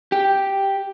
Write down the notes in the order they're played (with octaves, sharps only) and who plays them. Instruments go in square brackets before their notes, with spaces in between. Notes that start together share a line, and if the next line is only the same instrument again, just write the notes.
[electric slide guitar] G4